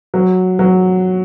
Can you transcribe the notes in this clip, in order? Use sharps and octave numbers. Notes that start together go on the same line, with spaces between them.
F#3
F#3